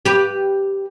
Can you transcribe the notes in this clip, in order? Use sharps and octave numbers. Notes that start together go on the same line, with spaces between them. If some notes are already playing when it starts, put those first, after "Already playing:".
G4 B4